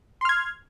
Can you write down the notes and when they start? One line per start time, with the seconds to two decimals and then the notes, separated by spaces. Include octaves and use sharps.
0.21 C6
0.25 F6
0.29 G#6